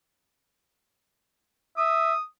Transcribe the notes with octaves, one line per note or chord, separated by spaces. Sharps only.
E5 D#6